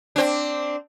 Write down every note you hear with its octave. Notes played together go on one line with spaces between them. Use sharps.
C4 D4